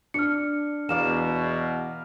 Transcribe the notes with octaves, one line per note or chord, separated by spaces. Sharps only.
D4 F6 C#7
E2 B2 D5 F5 A#5 E7